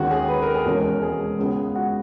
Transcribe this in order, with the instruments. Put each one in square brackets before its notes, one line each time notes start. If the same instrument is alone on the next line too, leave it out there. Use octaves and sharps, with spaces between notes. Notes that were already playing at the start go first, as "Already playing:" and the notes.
Already playing: [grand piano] D#2 D#3 G#3 C#4 F#4
G#4
B4
A#4
G#4
E1 E2 B2 G#3 C#4 A#4
G#4
C#2 C#3 G#3 B3
F#4